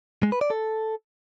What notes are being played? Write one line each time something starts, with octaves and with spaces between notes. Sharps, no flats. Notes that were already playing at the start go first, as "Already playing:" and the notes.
G#3
B4
D5
A4